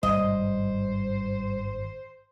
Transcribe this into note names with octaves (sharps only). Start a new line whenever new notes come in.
G#1 G2 B2 G3 C5 D#5